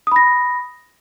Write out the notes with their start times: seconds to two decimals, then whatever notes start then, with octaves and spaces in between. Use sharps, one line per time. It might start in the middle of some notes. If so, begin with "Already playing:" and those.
0.07 D#6
0.12 B5
0.16 A#6